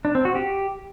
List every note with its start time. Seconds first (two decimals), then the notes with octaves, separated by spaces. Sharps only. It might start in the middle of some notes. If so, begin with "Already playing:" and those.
0.05 D4
0.15 C4
0.25 F#4
0.35 G4